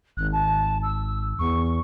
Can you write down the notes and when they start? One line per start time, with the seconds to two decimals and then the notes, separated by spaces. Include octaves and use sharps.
0.17 G#1 F#6
0.32 A5
0.83 E6
1.39 E2 C#6